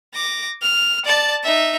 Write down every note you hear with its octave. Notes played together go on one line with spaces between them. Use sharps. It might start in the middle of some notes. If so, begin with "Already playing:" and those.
D6 A#6
F6
D5 A5
D#4 E5